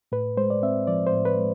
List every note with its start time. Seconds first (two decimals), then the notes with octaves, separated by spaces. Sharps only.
0.12 A2 B4
0.37 G#3 C5
0.50 D5
0.63 C4 E5
0.87 F3 D5
1.07 C5
1.13 A2
1.25 B4
1.38 G#3